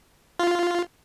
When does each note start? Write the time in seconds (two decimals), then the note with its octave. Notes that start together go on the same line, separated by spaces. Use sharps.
0.39 F4